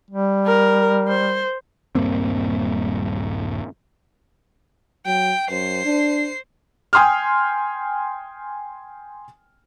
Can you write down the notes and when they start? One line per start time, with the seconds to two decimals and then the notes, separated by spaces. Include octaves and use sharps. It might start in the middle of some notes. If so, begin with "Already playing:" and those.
0.10 G3
0.46 A#4
1.08 C5
1.95 D#1 G2 A#3 C4
5.06 F#3 G5
5.49 F#2 C5 C7
5.85 D4
6.93 G5 G#5 C6 D#6 F6